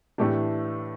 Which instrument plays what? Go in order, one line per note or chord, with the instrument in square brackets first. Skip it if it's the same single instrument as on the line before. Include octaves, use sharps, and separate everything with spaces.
[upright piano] A2 E3 A3 D4 G4